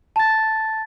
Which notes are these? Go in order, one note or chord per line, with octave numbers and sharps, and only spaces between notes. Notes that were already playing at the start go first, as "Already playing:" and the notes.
A5 A6